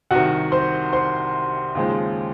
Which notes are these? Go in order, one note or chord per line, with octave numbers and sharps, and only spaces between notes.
C2 C3 D#3 F#4 F#5
C5 C6
C5 C6
D#2 C#3 F3 G#3